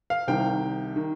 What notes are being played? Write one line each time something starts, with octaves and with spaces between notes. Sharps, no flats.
F5
C2 C3 D#3 G3 G5
D#3